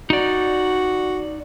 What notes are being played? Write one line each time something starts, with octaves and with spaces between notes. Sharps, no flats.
D#4 F#4 D5